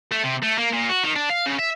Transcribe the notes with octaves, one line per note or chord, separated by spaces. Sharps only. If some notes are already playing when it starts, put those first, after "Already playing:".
A3
C3
A3
A#3
A#2
F#4
D#3
D4
F5
C#3
E5